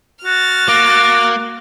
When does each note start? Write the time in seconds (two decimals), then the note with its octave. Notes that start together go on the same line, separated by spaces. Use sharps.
0.24 F#4 F6 A6
0.68 A#3 D6